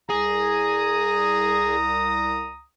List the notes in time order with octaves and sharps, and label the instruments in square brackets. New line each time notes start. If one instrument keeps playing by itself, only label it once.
[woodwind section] C2 A#5 D#6 [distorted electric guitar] G#4